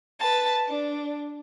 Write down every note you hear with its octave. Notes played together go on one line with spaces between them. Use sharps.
B4 A5
D4